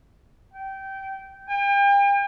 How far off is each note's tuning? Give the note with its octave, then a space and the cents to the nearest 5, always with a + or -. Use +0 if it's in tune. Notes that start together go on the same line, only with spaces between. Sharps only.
G5 -20
G5 +40